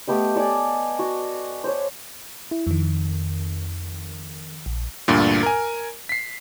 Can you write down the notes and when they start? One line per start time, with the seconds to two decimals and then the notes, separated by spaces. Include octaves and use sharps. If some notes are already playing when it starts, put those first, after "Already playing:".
0.08 A3 B3 G4 D#5
0.36 A4 D5 D#5 G#5
0.99 F#4
1.64 C5 C#5
2.51 E4
2.67 F2 D#3
4.66 A#1
5.08 D2 G2 A#2
5.43 A#4 G#5
6.09 B6 C7